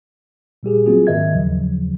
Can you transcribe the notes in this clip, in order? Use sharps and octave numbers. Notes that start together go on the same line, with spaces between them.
A#2 G3 G4 G#4
F#3 A#3 C4 F4 F#4 G#4
G#2 D#3 A#4 D#5 E5 G#6
D#2 A2 C#3 F3 F#3